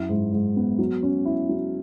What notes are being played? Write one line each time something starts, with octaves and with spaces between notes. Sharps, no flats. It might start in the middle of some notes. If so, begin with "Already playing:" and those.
Already playing: F#2 E4
G#2
G#2
B3
F#3
C#4
E4
F#3